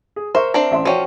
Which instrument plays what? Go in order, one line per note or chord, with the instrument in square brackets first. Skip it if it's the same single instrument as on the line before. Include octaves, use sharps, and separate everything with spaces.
[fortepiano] G#4
[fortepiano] A#4 E5 C#6 [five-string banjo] C5
[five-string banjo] C4 D4 A#5
[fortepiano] A1 E5 C6
[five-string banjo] F3 C#4 [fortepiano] F#4 D5 G5